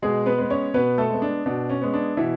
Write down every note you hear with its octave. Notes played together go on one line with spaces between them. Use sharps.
B2 G#3 G#4
B3 B4
G#3 B3
C#4 C#5
B2 B3 B4
A3 A4
G#3 B3
D4
B2 D4
C#4
G#3 B3
D4
B2 E3 E4